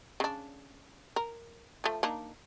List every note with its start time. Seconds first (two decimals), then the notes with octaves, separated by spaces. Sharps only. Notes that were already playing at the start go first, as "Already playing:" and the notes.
0.20 C#3 D4
1.16 A#4
1.84 F3 A3
2.03 A#3 D4 D#4